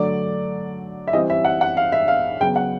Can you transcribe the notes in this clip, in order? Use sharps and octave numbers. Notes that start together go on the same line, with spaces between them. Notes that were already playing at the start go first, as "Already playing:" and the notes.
Already playing: D3 F#3 A3 D5
E5
E3 G3 C4 D#5
E5
F#5
F#5
F5
E5
F5
C#3 F#3 B3 G5
F#5